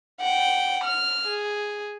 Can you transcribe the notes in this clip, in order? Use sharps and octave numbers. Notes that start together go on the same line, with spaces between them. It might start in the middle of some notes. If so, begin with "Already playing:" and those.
F#5 G5
F6
G#4